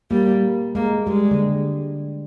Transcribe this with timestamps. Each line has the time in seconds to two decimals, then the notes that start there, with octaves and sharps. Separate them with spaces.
0.11 G3 A#3
0.75 G#3 A#3
1.07 G3 G#3
1.31 D3